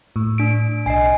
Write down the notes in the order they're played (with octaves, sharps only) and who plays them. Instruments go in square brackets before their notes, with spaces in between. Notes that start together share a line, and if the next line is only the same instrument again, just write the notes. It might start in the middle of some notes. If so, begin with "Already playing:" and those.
[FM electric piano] A2
[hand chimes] D4 D7
[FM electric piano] B1 C7 [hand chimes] D#5 G#5